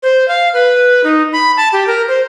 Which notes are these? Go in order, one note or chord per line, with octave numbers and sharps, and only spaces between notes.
C5
F5
B4
D#4
B5
A5
G4
A#4
C5